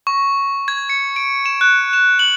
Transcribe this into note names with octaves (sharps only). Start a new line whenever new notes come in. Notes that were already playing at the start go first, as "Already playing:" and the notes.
C#6
G#6
C#7
D7
E7
F#6
E7
F#7